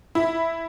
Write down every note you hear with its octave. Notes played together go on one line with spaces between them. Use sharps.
E4